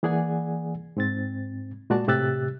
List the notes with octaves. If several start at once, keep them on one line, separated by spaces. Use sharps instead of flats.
E3 A#3 G#4 D5 F#5 G#5
G#2 C4 A6
A#2 G#3 F#4 D5 A5
A2 C3 G4 E6 F#6 A6